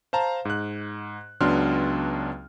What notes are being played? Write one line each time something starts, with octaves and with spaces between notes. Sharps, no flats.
C5 F5 A5 A#5
G#2 F#6
C#2 F#3 B3 D4 C6 F6